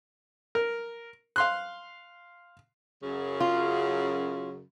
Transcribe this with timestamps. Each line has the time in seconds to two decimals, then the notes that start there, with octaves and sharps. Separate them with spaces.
0.55 A#4
1.36 F5 C6 F#6
3.03 F#2 C#3
3.40 F4